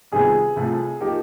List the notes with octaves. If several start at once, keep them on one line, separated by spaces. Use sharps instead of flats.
F2 C3 D#3 G3 B3 G#4
C2 C3 F3 A3
F3 A#3 D#4 G4